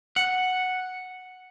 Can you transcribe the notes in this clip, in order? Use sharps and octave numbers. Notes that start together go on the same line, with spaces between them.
F#5